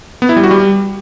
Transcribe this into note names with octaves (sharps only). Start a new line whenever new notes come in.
B3
E4
G3
F#4
G3